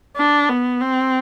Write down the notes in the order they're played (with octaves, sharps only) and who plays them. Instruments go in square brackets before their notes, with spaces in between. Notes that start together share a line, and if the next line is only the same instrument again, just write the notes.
[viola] D4
B3
C4